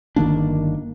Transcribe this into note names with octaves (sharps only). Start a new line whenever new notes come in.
G1 D#3 A#3 D4